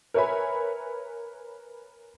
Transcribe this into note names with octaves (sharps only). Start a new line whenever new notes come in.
A#4 B4 C#5 E5 G#5 B5